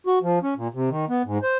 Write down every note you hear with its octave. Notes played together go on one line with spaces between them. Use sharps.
F#4
F3
C#4
A#2
C3
D#3
B3
G#2
C5